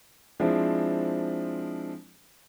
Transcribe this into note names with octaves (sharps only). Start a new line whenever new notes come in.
F3 G#3 C4 D4 E4